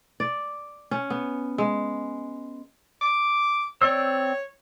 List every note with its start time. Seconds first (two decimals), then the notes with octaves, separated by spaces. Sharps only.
0.20 D5
0.91 C#4
1.10 B3
1.58 G#3
3.02 D6
3.82 C4 C#5 D5 E6